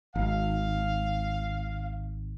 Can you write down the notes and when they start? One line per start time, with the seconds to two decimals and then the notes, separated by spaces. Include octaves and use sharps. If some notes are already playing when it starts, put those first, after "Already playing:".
0.15 G#1 F5